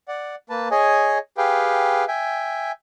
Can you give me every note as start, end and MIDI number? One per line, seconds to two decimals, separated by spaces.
0.08 0.35 74
0.08 0.35 78
0.50 0.68 58
0.50 0.68 71
0.50 0.68 81
0.71 1.18 68
0.71 1.18 73
0.71 1.18 75
0.71 1.18 80
1.38 2.05 67
1.38 2.05 68
1.38 2.05 71
1.38 2.05 77
1.38 2.05 79
2.08 2.71 76
2.08 2.71 79
2.08 2.71 80